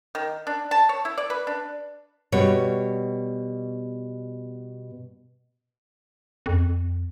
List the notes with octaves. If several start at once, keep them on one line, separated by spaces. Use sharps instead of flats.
D#3
D4
A5
C#5
E4
D5
B4
D4
B2 G3 C#5
F2